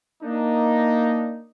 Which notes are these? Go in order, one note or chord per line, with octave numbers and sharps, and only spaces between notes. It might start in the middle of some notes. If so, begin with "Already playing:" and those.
A#3 D4 D#4